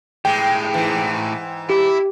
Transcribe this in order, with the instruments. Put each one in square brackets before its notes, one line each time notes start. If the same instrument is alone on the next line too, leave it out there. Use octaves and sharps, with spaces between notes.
[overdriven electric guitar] A2 G4 [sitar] G#3 [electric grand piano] G5
[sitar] G#2 E3
[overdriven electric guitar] E4 [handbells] G4